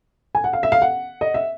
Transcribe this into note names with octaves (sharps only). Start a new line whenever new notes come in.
G#5
F#5
F5
E5
F5
F#5
D#5
E5